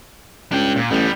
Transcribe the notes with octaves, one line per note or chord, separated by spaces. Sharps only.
C#2 D4 G5
A#2
A1 G3 B3